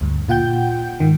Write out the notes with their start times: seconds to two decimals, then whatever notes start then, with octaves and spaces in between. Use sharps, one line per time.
0.01 D2 G2
0.29 A#2 F4 F#5 G5 G6
1.00 G#2 D#3